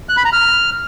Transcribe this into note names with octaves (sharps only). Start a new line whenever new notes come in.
F#6
B5
A#5
F6